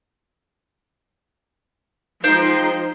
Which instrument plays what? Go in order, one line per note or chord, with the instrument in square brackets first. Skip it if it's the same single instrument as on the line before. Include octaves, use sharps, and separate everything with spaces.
[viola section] F3 G#3 C6 [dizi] D#4 [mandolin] C5 F5 G5